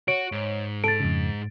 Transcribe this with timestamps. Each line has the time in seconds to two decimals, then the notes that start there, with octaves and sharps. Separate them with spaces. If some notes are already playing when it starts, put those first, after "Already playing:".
0.08 F#4 C#5 D7
0.32 G#2
0.84 A4 A6 D7
1.00 F2 C#3